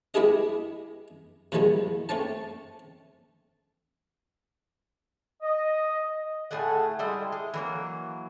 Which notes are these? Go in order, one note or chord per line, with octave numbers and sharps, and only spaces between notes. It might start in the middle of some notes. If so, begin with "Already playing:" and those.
G#3 B3 E4 G4 G#4 D#5
A#2 E3 F3 G3 G#3 B3
A3 C4 C#4 A5
D#5
A2 A3 G#4 F#5
G3 G#3 E4 D#5
G#3
E3 F#3 A#3